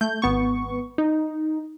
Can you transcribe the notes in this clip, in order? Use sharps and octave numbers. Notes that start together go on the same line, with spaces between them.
A3 G6
G#1 B3 C#6
D#4